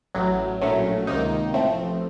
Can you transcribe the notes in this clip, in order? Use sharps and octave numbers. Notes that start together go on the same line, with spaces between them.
A1 A2 F#3
A#1 A2 F#3 A3 C#4
C#2 C3 D#3 A#3 D#4
A1 A2 F3 A3 C4